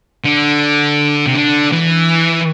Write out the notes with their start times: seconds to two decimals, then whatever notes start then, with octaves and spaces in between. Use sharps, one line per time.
0.24 D3
1.27 C3
1.35 D3
1.73 E3